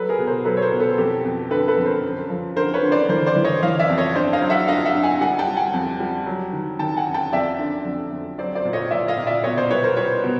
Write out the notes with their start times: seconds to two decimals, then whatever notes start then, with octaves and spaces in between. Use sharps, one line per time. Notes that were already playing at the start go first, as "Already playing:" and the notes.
Already playing: F#3 A4 B4
0.09 G#4 A#4
0.19 B2
0.27 A#4 C5
0.44 F#3 A4 B4
0.57 C#5
0.62 A#4 C5
0.72 B2
0.80 A4 B4
0.98 F2 G4 A4
1.24 F2
1.50 D3 A4 B4
1.68 A4 B4
1.77 F2
1.86 A#4 C5
2.03 F#2
2.30 F3
2.56 D3 A#4 C5
2.74 B4 C#5
2.83 D3
2.92 C5 D5
3.09 E3 A#4 C5
3.26 C5 D5
3.36 E3
3.44 C#5 D#5
3.63 E3 D#5 F5
3.79 D5 E5
3.89 F2
3.98 C#5 D#5
4.15 G2 C5 D5
4.33 D#5 F5
4.42 F#3
4.50 E5 F#5
4.68 G2 D#5 F5
4.85 E5 F#5
4.95 G2
5.03 F#5 G#5
5.21 G3 F#5 G#5
5.39 G5 A5
5.48 G3
5.57 F#5 G#5
5.73 F2
6.00 G3
6.26 F#3
6.53 D#3
6.79 D#3 G5 A5
6.97 F#5 G#5
7.07 F#2
7.14 G5 A5
7.32 F2 D5 E5
7.59 D3
7.85 F2
8.12 F2
8.38 F#3 C5 D5
8.55 C5 D5
8.65 A#2
8.73 C#5 D#5
8.91 A#2 D5 E5
9.08 D#5 F5
9.18 A#2
9.27 D5 E5
9.44 B2 C#5 D#5
9.57 C5 D5
9.70 G3 B4 C#5
9.83 A#4 C5
9.96 G3 B4 C#5
10.24 B2